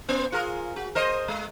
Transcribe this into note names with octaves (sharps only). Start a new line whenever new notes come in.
B3 C5
F4 G#4 A#4
F#4
A#4 C5 D#5
G#3